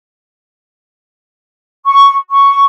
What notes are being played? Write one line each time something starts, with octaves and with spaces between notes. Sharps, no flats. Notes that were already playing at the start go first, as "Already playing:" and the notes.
C#6
C#6